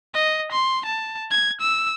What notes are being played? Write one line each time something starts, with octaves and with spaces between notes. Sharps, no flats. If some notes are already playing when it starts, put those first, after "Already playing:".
D#5
C6
A5
G#6
E6